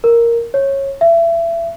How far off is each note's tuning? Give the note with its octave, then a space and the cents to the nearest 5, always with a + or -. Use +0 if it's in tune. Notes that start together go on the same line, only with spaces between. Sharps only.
A#4 +0
C#5 -15
E5 +30